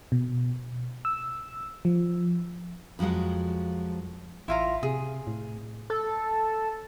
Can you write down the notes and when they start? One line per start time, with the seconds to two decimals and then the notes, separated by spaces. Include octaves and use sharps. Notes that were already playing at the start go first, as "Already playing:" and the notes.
0.12 B2
1.05 E6
1.85 F3
2.99 F2 F3 F#3 G#3 F#4
4.48 A1 E4 F4 A#5
4.83 C3 G#4
5.27 A2
5.90 A4